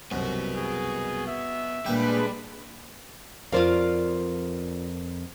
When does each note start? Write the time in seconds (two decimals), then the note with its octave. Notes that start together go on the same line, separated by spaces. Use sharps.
0.12 C2 F#2 B3 F#4
0.57 G#4
1.27 E5
1.86 A#2 G3 G#3 D4 B4 G5
3.52 F2 F4 A#4 C5 D5 F5